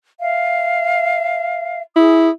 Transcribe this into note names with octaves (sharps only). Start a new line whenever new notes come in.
E5 F5
E4 G#4 D#6